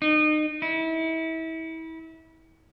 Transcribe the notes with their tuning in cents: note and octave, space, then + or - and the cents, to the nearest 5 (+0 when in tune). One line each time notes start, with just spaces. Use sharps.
D#4 -30
E4 -30